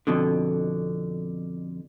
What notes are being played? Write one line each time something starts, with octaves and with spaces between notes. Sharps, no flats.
F2 B2 D3